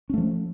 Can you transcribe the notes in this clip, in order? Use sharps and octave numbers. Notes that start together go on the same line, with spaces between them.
F3 A3 C#4